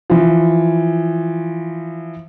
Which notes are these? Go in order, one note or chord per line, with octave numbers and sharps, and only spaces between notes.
E3 F3